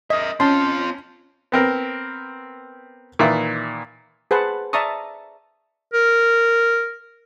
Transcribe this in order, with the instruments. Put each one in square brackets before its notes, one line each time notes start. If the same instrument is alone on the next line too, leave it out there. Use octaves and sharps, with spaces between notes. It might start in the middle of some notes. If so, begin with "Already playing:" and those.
[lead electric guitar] A#4 E5 [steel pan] D#5
[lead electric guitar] C4 F4 [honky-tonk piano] C#4 [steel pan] A5 C6
[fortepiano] B3 C4 A#4
A#2 D#3 E3 E5
[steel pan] G#4 B4 C5 F#5 A5
D5 E5 A5 A#5 C#6 D#6
[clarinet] A#4